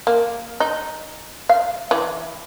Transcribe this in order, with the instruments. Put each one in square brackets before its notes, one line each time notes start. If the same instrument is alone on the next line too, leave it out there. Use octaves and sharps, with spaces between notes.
[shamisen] A#3
D#4
F5
E3